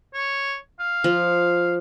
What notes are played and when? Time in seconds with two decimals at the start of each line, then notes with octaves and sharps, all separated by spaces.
0.14 C#5
0.80 F5
1.04 F3